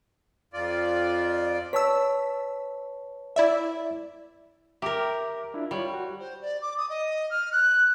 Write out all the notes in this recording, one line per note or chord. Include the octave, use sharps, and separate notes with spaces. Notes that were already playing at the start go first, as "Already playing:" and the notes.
F2 F4 D5
B4 C#5 A5 E6 B6
E4 D5 E5
G4 A#4 E5 A#5 D6
D4 E4 F4
G3 F4 C#5
F#4
C5
D5
D6
D#6
D#5
F6
F#6